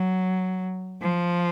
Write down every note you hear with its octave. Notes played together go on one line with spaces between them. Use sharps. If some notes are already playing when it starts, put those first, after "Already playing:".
Already playing: F#3
F3